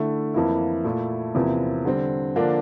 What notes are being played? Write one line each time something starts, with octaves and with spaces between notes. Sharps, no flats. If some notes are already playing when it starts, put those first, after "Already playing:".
Already playing: D3 A3 E4
F2 E3 A#3 E4
A#2 A3 E4
E2 C3 F3 A#3 E4
D3 G3 C4
D3 F3 A#3 D4